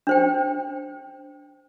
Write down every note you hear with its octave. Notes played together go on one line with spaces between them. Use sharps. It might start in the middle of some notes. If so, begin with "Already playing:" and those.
D4 C5 G5